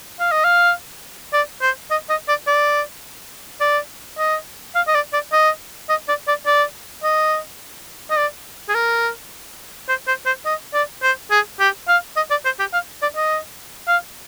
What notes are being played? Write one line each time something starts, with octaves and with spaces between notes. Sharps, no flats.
F5
D#5
F5
D5
C5
D#5
D#5
D5
D5
D5
D#5
F5
D#5
D5
D5
D#5
D#5
D5
D5
D5
D#5
D#5
D5
G#4
A#4
C5
C5
C5
D#5
D5
C5
G#4
G4
F5
D#5
D5
C5
G4
F5
D5
D#5
F5